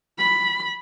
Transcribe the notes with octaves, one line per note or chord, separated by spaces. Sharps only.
B5